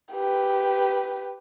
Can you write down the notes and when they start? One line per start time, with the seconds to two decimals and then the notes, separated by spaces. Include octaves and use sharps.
0.13 G4 B4